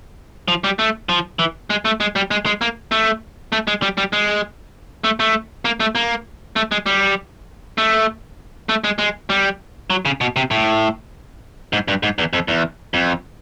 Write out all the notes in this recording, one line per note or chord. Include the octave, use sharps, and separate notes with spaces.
F3
G3
A3
F3
E3
G#3
A3
G#3
G3
G#3
G#3
A#3
A3
A3
G#3
G3
G3
G#3
A3
A3
A#3
A3
A#3
A3
G#3
G3
A3
A3
G#3
G#3
G3
F#3
C#3
B2
C3
A2
G#2
G2
G#2
E2
F2
E2
F2